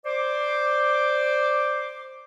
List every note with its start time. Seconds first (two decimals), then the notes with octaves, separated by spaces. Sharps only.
0.05 C5 D5 D6